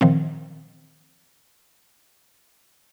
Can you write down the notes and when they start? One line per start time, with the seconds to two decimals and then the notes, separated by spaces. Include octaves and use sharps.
0.01 A#2 D#3 F3 C4